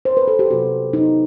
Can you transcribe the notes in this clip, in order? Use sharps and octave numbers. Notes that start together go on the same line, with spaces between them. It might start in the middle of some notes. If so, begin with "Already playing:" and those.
C5
B4
A4
G4
C3 F#3 B3 F#4
C3 F#3 B3 D#4